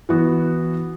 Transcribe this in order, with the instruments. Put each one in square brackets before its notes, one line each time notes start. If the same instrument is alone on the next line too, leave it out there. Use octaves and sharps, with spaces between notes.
[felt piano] E3 B3 F#4